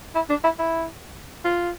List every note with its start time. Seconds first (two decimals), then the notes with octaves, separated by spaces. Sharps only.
0.16 E4
0.30 D4
0.44 E4
0.59 E4
1.45 F4